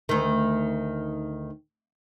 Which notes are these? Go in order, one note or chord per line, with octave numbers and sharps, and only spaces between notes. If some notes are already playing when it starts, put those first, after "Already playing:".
D2 D#3